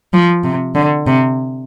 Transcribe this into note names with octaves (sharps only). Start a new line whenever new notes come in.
F3
C3
D3
C3